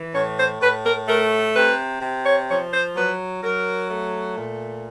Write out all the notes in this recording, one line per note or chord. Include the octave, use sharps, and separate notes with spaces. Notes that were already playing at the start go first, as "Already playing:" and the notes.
Already playing: E3
A2 C#5
C5
A2 B4
A#4
A3 A#4
C3 B4
C3
C#5
F3 C#5
C5
F#3 B4
F#3 A#4
A3
A#2